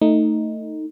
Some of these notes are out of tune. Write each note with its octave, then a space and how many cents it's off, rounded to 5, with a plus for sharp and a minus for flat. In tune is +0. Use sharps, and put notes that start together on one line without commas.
A3 +20 D#4 +0